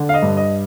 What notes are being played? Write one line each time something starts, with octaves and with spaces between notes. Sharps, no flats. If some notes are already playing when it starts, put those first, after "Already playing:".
Already playing: D3
F5
D#5
G2
D#5